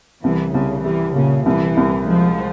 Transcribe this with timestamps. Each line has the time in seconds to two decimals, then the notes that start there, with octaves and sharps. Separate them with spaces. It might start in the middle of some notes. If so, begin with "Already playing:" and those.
0.24 C2 E3
0.54 C2 C#3
0.84 E3 G3
1.16 A#2 C#3
1.46 C2 E3
1.77 C2
2.07 F3 G#3